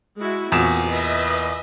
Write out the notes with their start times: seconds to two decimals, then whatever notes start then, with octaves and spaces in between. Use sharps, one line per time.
0.17 G#3 E4 F#4
0.52 E2 A#2 C4 F#4 E7
0.87 B4 D#5 E5